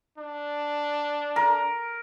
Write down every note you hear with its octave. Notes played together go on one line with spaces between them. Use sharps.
D4
A#4